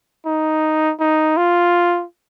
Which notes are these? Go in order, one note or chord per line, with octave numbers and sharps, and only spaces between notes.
D#4
D#4
F4